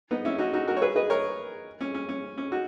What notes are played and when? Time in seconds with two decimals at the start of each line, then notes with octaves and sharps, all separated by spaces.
0.11 B3 D#4
0.25 C#4 E4
0.38 D#4 F#4
0.53 D#4 F#4
0.67 F#4 A#4
0.77 C#5
0.82 G#4 B4
0.96 B4 D#5
1.10 A#4 C#5
1.81 C#4
1.94 C#4
2.09 C#4
2.38 C#4
2.52 D#4 F#4